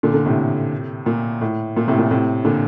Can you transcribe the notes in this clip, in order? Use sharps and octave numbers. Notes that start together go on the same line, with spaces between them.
A#2 D3
D3
A2 C3
A#2
A2
A#2
A2 C3
A#2
A2 C3
A#2 D3